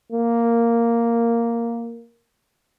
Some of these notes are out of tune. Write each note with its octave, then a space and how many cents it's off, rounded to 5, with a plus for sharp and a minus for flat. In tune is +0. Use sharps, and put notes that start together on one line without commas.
A#3 -5